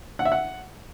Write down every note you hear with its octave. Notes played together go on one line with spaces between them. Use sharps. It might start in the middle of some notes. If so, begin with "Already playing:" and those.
F#5
E5
F#5